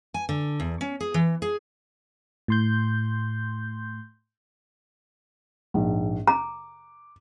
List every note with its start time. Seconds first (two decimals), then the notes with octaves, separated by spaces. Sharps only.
0.14 G#5
0.29 D3
0.60 E2
0.81 C#4
1.01 G#4
1.14 E3
1.42 G#4
2.48 A2 C6 G6
5.74 A#1 G#2
6.27 A#5 D6